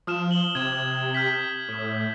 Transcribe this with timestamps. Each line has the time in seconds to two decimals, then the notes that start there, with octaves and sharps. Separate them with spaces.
0.07 F3 D#6 F6 E7
0.31 F#7 G7
0.55 C3 G#6 E7
1.14 F6 G6 B6
1.69 A2